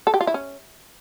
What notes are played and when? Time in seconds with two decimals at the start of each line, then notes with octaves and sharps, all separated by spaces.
0.07 A4
0.14 G4
0.21 F4
0.27 E4
0.34 C#4